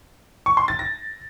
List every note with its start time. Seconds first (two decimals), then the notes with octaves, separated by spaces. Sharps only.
0.46 C#6
0.57 C6
0.68 A6
0.79 A#6